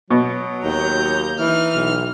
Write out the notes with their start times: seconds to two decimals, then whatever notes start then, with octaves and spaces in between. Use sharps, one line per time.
0.11 B2 F#3
0.64 D#2 A#5 G6
1.40 E3 D#4 F6
1.75 B1